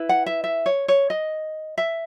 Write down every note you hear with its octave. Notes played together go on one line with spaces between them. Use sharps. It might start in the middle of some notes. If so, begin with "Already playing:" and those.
Already playing: E4 B4
F#5
E5
E5
C#5
C#5
D#5
E5